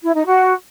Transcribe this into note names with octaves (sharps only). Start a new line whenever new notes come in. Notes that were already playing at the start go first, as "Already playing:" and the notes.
E4
D#4
F#4